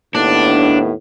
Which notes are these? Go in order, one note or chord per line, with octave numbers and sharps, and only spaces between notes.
D#2 A2 B3 D4